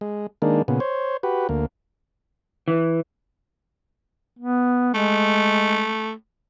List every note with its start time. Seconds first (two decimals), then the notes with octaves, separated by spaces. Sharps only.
0.01 G#3
0.42 D#3 G#3 A#3 D4
0.68 A#2 C#3 B3
0.80 C5 C#5
1.23 F#4 G4 B4
1.49 D2 A#3
2.68 E3
4.39 B3
4.95 G#3 A3